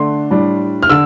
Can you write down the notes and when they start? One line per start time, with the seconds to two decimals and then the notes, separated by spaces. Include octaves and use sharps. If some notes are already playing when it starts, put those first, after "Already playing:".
Already playing: D3 A3 D4 C6
0.31 A2 G3 D4
0.83 F6
0.90 D3 E6